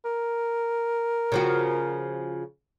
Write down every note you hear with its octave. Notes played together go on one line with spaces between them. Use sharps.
A#4
C#3 F3 F#4